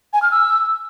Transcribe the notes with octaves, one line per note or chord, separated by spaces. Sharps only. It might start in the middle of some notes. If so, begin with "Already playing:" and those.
G#5
F6
E6